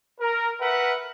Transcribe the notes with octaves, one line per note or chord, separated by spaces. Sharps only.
A#4
A#4 B4 E5 F#5